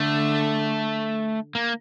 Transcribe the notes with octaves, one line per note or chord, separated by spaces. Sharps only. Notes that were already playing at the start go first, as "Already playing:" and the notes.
Already playing: D3 A3
A#3